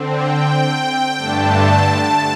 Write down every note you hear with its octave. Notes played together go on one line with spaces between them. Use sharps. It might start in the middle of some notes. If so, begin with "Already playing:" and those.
Already playing: D3 C4
G5
G2 D3 A3 D4 A5